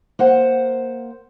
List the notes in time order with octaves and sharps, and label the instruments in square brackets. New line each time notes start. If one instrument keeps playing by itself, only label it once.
[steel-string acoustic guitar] A#3 C5 F#5